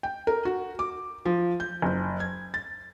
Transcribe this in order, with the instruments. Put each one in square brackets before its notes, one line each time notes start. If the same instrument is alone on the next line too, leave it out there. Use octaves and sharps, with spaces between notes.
[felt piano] G5
A#4
F#4
D6
F3
G6
F#1
G#6
A6